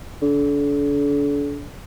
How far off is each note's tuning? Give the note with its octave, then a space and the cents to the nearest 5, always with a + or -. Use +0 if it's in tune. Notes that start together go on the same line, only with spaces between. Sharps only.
D3 -40